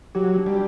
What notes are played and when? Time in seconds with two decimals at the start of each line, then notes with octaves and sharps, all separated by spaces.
0.15 F#3 G4
0.38 D4
0.46 G3